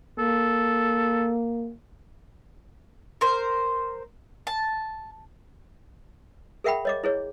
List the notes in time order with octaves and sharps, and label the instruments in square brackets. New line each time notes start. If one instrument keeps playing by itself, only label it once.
[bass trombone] A#3 [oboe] A4
[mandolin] A#4 C5
A5
[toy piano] G#4 A#4 E5 F#5 G5 B5
C#5 D#5 D6
E4 G#4 C#5